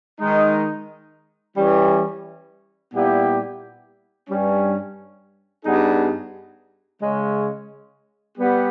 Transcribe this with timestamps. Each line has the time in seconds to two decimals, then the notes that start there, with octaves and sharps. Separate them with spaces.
0.21 D#3 G#3 D#4
1.56 E3 G3 C#4
2.92 A#2 G3 B3 E4 G4
4.29 G2 G3 C#4
5.65 G2 G3 B3 D#4 G#4
7.02 C#3 G#3 C#4
8.37 G3 B3 G4